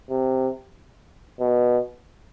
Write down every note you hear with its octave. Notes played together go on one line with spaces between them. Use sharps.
C3
B2